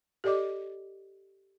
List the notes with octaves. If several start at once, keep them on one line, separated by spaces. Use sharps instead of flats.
G4 A4 D5 D#5 D6